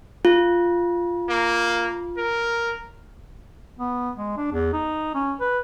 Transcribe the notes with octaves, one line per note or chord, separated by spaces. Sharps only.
F4
A#3
A#4
B3
G#3
D4
E2
D#4
C#4
B4